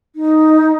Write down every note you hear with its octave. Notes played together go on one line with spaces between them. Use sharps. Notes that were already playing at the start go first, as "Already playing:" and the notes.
D#4